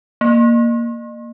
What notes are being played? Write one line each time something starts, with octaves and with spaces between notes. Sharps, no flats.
A#3